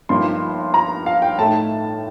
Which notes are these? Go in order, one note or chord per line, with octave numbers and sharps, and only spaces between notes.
G1 G2 F3 A#3 D#4 C6
A#5
F5
G5
A2 A3 D#4 A5